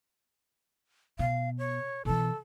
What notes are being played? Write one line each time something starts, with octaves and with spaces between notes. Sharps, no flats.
B2 F5
C#5
B2 E3 A4